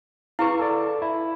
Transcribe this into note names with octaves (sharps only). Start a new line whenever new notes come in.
E4 G#4 B4 F5 C#6
A4 D5
E4